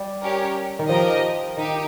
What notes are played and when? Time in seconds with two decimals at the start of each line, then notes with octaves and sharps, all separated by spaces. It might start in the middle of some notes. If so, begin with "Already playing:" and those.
Already playing: G3
0.20 C#4 G4 A#4 C#5
0.79 D#3
0.89 F3 G4 A#4 D#5
1.57 D#3 D#4 G4